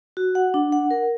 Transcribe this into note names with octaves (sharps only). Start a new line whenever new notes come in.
F#4
F#5
D4
F#5
A#4